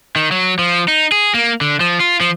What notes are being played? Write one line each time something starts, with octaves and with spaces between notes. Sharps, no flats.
D#3
F#3
F3
D#4
G#4
A#3
D3
F3
F4
F3